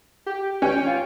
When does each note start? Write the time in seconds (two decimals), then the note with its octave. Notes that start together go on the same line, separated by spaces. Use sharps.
0.26 G4
0.62 C#4 G5
0.87 F4